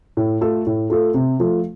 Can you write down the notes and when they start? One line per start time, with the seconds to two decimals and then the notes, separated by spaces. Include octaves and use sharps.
0.17 A2
0.41 A3 F4 A4
0.66 A2
0.90 A3 F4 A4
1.14 C3
1.39 F3 A3 F4